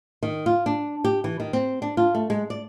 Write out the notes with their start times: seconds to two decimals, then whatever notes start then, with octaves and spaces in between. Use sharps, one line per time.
0.23 D#3
0.46 F4
0.66 D4
1.04 G4
1.24 E3
1.40 D#3
1.53 C4
1.82 D4
1.97 F4
2.15 A3
2.30 G#3
2.50 D5